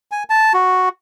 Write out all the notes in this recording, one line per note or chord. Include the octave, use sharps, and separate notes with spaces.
G#5
A5
F#4